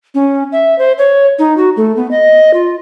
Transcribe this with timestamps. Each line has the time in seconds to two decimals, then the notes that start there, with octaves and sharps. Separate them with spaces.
0.15 C#4
0.52 E5
0.79 C5
0.98 C#5
1.39 D#4
1.57 F#4
1.77 A3
1.96 B3
2.11 D#5
2.54 F4